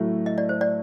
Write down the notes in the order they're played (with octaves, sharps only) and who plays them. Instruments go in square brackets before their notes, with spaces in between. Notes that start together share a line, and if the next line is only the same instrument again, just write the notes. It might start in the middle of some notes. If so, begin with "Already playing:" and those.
Already playing: [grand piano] A2 F#3 A3
[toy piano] D#5
D5
C5
D5